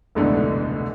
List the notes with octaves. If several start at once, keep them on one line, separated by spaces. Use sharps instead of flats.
F1 D2 G#2 B2 D3 E3